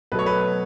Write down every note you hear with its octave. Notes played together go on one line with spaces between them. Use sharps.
B2 F#3 A3 B4
C#5
B4